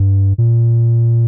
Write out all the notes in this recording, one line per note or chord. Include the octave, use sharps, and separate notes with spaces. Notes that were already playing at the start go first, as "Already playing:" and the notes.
Already playing: G2
A#2